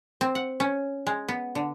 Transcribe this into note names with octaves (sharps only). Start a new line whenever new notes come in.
C4
F#5
C#4
G#3
B3
D3